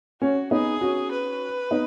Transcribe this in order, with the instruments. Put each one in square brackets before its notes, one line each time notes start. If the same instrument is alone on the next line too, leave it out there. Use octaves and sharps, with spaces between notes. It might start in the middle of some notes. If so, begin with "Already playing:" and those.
[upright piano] C#4 [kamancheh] F#4
[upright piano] B3 D#4 [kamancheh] G#4
[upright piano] C#4 F#4
[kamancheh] B4
[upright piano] B3 D#4